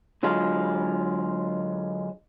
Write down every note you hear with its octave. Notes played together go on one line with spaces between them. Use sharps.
D3 F#3 G#3 F4